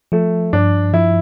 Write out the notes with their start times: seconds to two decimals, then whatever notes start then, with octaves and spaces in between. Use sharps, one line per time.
0.12 F3 A3
0.53 G2 D4
0.93 F3 E4